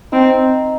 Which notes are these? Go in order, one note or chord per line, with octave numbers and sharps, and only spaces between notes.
C4 D#4